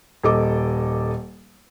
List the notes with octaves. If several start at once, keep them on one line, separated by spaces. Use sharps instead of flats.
D#1 A4 D#5 D6